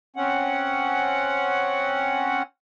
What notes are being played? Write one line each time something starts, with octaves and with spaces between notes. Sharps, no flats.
C4 C#4 F#5